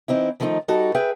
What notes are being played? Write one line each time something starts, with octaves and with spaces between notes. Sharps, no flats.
E3 C4 D#4 E4
D#3 F3 A3 C#4 D#4
G3 D#4 F#4 A4
G#4 B4 E5 G5